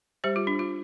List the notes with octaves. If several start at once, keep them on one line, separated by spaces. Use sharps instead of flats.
G3 G4 C5
F4
D4
F4